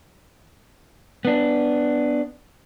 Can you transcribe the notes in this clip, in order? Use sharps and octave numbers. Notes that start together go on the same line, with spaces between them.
B3 D4